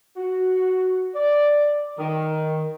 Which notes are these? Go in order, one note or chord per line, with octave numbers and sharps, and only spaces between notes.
F#4
D5
D#3